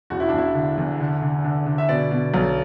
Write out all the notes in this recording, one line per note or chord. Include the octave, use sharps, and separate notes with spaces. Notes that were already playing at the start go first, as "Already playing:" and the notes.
E1 F#4
E4
E1 D4
E4
D3
E2
D3
D3
D3
D3
E5
B2 D5
B2
B1